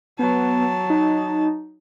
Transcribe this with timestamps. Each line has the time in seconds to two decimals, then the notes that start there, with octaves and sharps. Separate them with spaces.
0.19 F#3 B3 A5
0.90 D#4